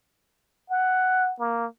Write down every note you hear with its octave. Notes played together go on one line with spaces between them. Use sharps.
F#5
A#3